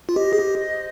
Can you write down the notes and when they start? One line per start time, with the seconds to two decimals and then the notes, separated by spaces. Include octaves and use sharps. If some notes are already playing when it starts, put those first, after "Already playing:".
0.09 F4
0.16 G4 C5 D#5
0.33 G#4
0.39 G4